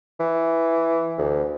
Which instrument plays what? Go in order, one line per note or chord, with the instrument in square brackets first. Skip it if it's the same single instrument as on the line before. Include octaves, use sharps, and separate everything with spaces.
[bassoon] E3
D2